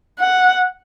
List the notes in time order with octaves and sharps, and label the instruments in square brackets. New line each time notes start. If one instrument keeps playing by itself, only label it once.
[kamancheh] F#5